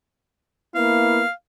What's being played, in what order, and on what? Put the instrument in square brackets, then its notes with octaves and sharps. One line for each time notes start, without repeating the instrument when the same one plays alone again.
[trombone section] A#3 B3 E4 [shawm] F5